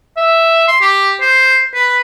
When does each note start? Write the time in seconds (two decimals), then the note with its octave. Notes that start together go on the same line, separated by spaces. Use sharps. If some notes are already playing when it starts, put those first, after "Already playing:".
0.17 E5
0.68 C6
0.81 G4
1.21 C5
1.74 B4